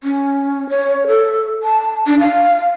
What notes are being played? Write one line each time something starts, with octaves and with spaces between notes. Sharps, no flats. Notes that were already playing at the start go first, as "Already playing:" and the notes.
C#4
C#5
A4
A5
D4
F5